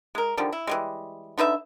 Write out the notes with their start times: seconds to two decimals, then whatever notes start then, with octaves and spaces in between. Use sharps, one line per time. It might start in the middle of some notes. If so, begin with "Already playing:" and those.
0.15 G#3 A#4
0.37 D3 D#3 F3 G3
0.53 E4
0.67 E3 G3 G#3
1.38 D3 D#4 B4 E5